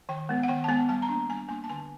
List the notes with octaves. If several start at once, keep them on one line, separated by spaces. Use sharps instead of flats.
D#3 G5
G#3 B3
F#5
D#3 G5
A5
G#3 B3 G#5
G3 A5
A#5
A#3 D4
G3 G#5
A#3 D4 G#5
A5
D3 G#5